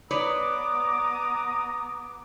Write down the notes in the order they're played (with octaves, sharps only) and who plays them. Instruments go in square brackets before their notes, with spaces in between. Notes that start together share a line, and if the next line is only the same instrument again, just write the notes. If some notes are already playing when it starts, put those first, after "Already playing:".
[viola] B3 D6 [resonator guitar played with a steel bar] B4 C#5 D5 [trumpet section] A#5 D#6